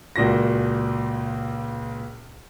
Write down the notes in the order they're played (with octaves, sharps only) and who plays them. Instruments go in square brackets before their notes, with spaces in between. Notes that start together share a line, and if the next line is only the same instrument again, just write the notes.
[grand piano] C#2 A#2 F#4 A#6